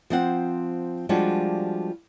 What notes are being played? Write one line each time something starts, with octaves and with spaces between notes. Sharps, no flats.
F3 C4 F#5
F3 G3 G#3 D4 F4 F#4